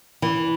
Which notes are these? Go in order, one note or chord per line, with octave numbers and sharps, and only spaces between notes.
E3